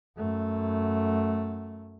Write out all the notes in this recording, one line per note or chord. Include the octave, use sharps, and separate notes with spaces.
F#2 A3